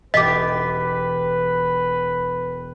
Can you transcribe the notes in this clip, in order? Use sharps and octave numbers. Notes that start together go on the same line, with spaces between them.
E1 G4 B4 D#5 D6 B6